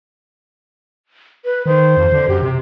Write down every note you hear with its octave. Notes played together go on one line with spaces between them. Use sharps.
B4
D#3 C5
F2
D3
F#2 G4
C3